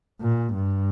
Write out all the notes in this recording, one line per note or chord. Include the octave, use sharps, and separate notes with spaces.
A#2
G2